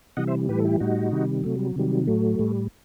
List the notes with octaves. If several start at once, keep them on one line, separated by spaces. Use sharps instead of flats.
C3 E3 G3 D#5 F#5
C5 E5
A2 E3 G3 G4 B4
A4
E4 G4
A2 G3 D#4 F#4
C3 D#3 G3
C3 F#3 A3
G3
C3 D#3 F#3 G3
A2 F#3 A3
A2 G3